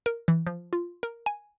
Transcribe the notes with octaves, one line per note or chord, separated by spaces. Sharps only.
A#4
E3
F3
F4
A#4
G#5